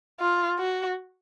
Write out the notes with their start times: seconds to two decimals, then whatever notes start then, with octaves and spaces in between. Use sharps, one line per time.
0.20 F4
0.59 F#4